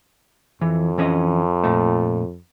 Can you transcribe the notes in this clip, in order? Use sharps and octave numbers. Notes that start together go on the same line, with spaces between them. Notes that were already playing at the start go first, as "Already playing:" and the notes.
F2 E3
E3 C#4 D#5
A#2 A3